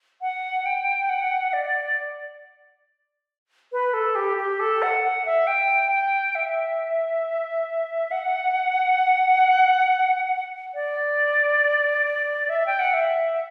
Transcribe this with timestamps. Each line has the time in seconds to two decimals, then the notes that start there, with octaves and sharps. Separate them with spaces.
0.22 F#5
0.66 G5
1.09 F#5
1.53 D5
3.72 B4
3.94 A4
4.15 G4
4.37 G4
4.60 A4
4.82 F#5
5.04 F#5
5.25 E5
5.47 G5
5.92 G5
6.35 E5
8.11 F#5
10.74 D5
12.49 E5
12.66 G5
12.79 F#5
12.94 E5